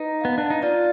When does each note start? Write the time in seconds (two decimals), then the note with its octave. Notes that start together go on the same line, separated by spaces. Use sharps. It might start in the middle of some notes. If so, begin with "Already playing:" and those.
Already playing: D#4 B4 A#5
0.21 B3 F5
0.38 D4
0.50 D#4
0.63 F4 D5